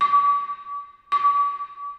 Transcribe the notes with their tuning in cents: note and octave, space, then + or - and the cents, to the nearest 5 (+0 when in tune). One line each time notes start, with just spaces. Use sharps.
D6 -45
D6 -45